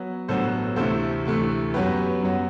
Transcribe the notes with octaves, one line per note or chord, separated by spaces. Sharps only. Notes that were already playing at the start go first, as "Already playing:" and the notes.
Already playing: F#3 B3
A1 G2 F#3 B3 A4 C5
D2 C3 E3 A3 A4 C5
D2 C3 E3 A3
F#2 F#3 B3 G4 B4
F#2 F#3 B3